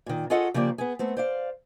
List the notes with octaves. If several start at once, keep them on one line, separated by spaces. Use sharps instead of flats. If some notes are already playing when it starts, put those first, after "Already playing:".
A#2 D#3
F4 G#4 A4 C#5 D#5 F#5
C#3 F3 A#3 G4 D5
B3 G#4
A3 B3 C4
C5 D5 F5